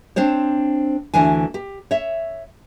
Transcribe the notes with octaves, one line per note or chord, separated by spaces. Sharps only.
C4 D4 C5 C#5
D2 E3 D4 G#5
G4
C#5 E5